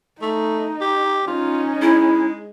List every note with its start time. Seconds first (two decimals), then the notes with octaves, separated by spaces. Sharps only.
0.22 A3 D#4
0.81 G4
1.28 C#4 D#4 F4
1.82 G#3 E4